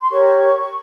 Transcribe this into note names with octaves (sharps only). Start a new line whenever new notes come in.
C6
G4 A#4 C#5 C#6